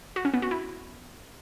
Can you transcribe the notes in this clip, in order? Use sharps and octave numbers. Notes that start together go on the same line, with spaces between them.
F#4
C#4
B3
F#4
E4